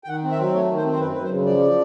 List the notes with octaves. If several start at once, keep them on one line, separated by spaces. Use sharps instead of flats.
G5
D#3 F#5
C4
E5
F#3
A3 C#5
D#3
C5
C4
C5
F#2 B4
F#2 B4
C5
C#3
F3 D5